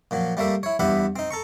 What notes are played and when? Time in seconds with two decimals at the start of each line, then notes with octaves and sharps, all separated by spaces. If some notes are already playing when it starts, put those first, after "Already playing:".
0.11 A#2 F3 F#3
0.37 G3 A3 A#3 E5
0.63 E4 C#5
0.79 E2 G2 G4 E5 F#5 B5
1.16 C4 D#4
1.31 A4 A#5 C#6